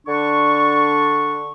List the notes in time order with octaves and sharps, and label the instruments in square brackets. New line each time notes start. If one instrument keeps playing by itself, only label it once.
[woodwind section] D3 D4 C#6